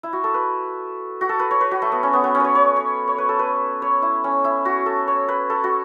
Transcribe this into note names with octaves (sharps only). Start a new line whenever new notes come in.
E4
F#4
A4
B4
F#4
A4
B4
C#5
B4
F#4
A3
B3
C#4
B3
B3
C#4
B4 C#5
C#5
C#5
C#5
B4
A4
B4
C#5
E4
C#4
E4
F#4
A4
C#5
B4
A4
F#4